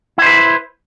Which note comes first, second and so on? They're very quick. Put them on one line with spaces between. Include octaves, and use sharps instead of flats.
E4 C5 B4